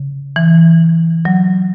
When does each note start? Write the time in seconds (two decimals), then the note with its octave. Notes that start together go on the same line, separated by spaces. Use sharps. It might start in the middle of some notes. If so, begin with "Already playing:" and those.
Already playing: C#3
0.36 E3
1.25 F#3